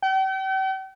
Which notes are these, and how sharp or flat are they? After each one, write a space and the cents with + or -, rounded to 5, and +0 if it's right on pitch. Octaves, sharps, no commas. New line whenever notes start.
G5 -40